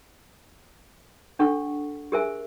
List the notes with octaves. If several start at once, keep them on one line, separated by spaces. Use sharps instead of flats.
D4 G4 A4 F#5 C#6
G4 G#4 A#4 C5 E5 G#5